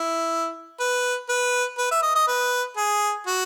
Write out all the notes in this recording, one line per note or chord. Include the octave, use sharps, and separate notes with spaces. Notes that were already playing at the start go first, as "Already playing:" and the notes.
Already playing: E4
B4
B4
B4
E5
D#5
D#5
B4
G#4
F#4